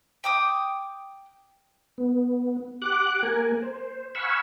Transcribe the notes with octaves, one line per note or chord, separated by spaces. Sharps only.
G5 D6 D#6
B3
G4 F#5 D6 F#6
A#3 A#4 G#5
C5
F5 F#5 G#5 B5 C#6 E6